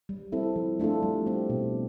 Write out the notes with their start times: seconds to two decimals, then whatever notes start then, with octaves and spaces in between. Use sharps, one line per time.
0.09 G3
0.32 C4 E4 A4
0.56 F3
0.80 A3 D4 F4 A4
1.03 G3
1.26 C4 G4
1.50 B2